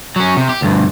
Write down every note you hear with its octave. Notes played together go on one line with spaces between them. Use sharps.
F#3 C#4
C3
G4
D2 G2